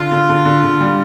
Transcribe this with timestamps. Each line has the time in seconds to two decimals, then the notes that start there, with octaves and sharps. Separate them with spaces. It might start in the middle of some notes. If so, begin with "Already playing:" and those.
Already playing: D3 F4
0.11 D3
0.29 D3
0.45 D3
0.63 D3
0.81 G3